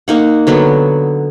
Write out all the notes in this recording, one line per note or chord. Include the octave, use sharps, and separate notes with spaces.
A#3 D#4 F#5
D3 F#3 B3